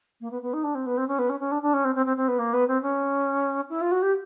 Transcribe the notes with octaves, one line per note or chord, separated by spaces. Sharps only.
A#3
B3
B3
D#4
D4
C4
B3
C4
C#4
B3
C#4
C#4
D4
D4
C#4
C4
C4
C4
C4
B3
A#3
B3
C4
C#4
E4
F4
F#4
G4